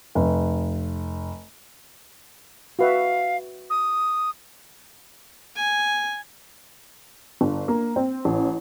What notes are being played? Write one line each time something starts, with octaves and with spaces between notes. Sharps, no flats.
F1
F#4 B4 E5 F5
D#6
G#5
G1
A#3
C4
A1